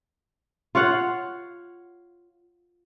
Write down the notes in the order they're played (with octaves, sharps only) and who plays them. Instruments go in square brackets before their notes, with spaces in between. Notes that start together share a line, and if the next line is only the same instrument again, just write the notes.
[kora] F4 C#5 F5 F#5